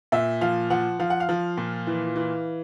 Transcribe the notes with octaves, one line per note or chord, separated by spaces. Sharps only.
A#2 E5
F3 F5
F3 F#5
F3 F5
F#5
F5
F3
A#2
E3
E3